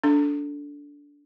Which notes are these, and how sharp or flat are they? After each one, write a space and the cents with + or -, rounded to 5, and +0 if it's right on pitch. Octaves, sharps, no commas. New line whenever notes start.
D4 -20 A4 +0